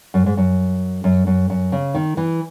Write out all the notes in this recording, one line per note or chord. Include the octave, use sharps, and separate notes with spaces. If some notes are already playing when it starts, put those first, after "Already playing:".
F#2
G#2
F#2
F#2
F#2
F#2
C#3
D#3
E3